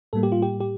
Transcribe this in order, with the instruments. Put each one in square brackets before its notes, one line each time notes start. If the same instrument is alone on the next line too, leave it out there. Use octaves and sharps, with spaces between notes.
[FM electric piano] A2 G3 A#3 A4
G4
F4
G4
G4